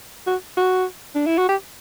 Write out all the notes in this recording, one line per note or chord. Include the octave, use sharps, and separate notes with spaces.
F#4
F#4
D4
E4
F#4
G4